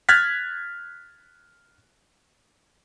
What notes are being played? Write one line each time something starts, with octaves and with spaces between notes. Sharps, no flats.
F6 F#6 G#6 A6 B6